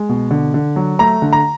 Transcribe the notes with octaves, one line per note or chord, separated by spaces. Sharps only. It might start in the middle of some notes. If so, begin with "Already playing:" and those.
Already playing: G#3
B2
D3
D3
F#3
A3 A#5
D3
A#5